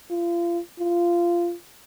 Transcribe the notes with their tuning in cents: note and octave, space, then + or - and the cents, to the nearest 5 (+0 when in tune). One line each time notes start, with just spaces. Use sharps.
F4 -30
F4 -15